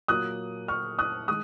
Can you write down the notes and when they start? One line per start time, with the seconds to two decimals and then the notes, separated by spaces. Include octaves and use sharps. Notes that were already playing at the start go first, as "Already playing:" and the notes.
0.08 A#2 F#3 A#3 D#6 F#6
0.68 C#6 F6
0.99 D#6 F#6
1.28 D#3 G#3 D#6 F#6